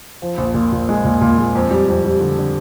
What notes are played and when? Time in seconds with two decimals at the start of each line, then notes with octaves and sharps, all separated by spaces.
0.22 F3
0.38 A#1
0.54 A#2
0.72 A#2
0.89 G#3
1.04 A#2
1.21 A#2
1.38 G#3
1.55 F2
1.71 G3
1.88 F2
2.05 G3
2.21 D3
2.39 D3